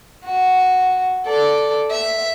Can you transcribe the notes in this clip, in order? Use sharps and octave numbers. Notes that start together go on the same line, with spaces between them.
F#4
A4 D5
E5